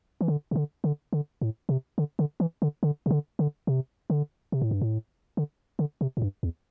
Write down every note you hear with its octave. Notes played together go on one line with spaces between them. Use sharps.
E3
D3
C3
D3
D3
D3
A2
C3
D3
D3
E3
D3
D3
C3
D3
D3
C3
D3
C3
A2
G2
A2
D3
D3
C3
A2
G2
E2